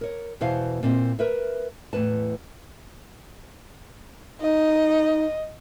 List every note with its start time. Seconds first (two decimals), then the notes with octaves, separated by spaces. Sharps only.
0.01 A#4 C#5
0.41 E2 B2 E4 C5 F5
0.83 A#2 C4 E4
1.19 A#4 B4 E5
1.93 E2 A2 B4 A5
4.41 D#4 D#5